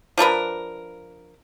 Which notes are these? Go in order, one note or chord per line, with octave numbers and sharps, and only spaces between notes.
F3 D4 A#4 B4